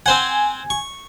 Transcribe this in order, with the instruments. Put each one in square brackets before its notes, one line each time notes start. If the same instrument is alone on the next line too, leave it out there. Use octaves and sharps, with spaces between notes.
[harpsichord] C4 C5 F#5 [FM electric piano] G#5
[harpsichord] C#6